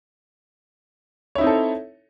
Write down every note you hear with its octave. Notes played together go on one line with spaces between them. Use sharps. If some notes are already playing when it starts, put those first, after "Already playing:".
C4 D#4 E4 A4 C#5